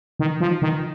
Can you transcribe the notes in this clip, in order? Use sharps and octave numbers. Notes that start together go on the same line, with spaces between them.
D#3
F3
D#3